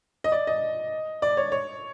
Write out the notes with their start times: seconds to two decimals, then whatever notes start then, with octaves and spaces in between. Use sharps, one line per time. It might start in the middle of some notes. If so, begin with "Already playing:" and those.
0.24 D#5
0.32 D5
0.47 D#5
1.22 D5
1.37 C#5
1.52 C#5